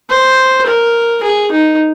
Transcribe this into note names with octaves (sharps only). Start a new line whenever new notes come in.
C5
A#4
G#4
D#4